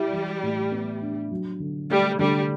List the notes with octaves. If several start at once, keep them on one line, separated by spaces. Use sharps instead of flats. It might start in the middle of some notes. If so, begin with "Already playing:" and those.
Already playing: G3 E4
E3
A2
B3
D4
F#3
D3
G3 A3
D3 G3